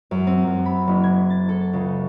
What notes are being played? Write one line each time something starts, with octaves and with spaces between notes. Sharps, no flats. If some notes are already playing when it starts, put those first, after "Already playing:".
F#2
C4
F#2
B5
F#1
G#6
A6
A4
C#2